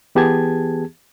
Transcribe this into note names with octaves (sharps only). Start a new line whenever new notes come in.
E3 B3 G4 G#4 A5 G#6